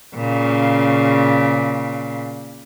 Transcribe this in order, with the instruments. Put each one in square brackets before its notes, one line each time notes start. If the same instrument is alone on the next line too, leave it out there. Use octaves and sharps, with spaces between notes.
[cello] A#2 C#3